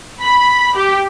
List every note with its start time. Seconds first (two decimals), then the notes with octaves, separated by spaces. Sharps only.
0.22 B5
0.75 G4